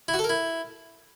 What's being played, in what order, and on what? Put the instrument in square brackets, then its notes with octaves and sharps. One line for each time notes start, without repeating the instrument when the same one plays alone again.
[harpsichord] E4
F#4
A4
A#4
E4